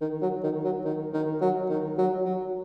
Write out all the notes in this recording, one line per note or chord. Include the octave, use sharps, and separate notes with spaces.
D#3
F#3
D#3
F#3
D#3
D#3
F#3
D#3
F#3
F#3